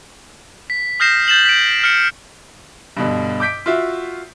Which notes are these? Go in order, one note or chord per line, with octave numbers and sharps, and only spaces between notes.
B6
D#6 F6 G6 A#6 C7 E7
G6 A6 E7 F#7
B6 D7
F6 C#7
G2 B2 D3
D6 G6 B6 D7
F4 F#4 E5